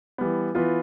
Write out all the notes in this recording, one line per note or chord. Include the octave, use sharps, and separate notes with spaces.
E3 G3 B3
E3 B3 F4